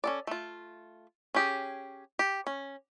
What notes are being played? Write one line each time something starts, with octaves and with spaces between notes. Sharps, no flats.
C#4 A4 D5
A3 F4
C#4 G4 G#4
G4
C#4